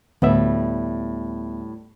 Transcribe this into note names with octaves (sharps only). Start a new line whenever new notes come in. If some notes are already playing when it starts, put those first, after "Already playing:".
D2 A2 G3 B3 E5